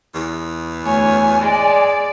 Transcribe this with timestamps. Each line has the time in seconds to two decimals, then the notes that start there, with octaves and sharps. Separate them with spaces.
0.14 E2
0.85 D2 C#5 G#5
1.40 G#3 D5